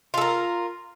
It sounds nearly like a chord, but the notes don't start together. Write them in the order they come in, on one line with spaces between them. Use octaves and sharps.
F4 A4 A#4